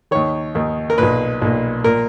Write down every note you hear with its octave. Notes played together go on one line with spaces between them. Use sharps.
D#2 D#3 C#5
D#2 D#3
A#4
B1 A#2 B4
B1 A#2
A#2 A#4